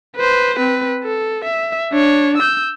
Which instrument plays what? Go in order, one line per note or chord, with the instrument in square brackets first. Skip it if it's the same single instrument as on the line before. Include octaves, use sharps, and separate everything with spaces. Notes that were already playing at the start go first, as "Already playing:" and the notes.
[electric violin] B4 C5
C4 B4
A4
E5
D4 C#5
E6 G6